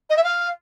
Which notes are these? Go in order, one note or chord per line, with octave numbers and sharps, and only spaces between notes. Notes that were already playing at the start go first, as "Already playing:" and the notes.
D#5
E5
F5